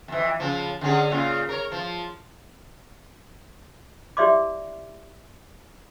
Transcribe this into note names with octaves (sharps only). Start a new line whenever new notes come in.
F2 E3
C#3 F3
D3 C#4 G#4
A#2 C#3 F4
A#4 C#5
F3
E4 G4 D5 E5 C6 D6